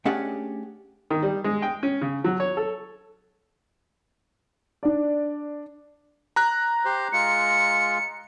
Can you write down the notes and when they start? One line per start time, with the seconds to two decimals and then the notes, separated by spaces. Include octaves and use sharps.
0.05 A3 C#4 D4 G4 G#4 F#5
1.10 D#3
1.22 G3
1.44 G#3
1.62 G5
1.83 C#4
2.01 C#3
2.24 F#3
2.40 C#5
2.57 A4
4.83 D4 D5
6.36 A#5 F#6
6.85 G4 C5
7.13 G#3 F4 C#7